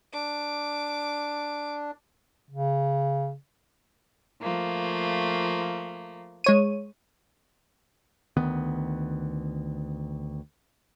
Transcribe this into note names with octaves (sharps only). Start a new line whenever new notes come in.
D4 D6
C#3
F3 A3 A#3
G#3 C#5 D#7
D2 D#3 B3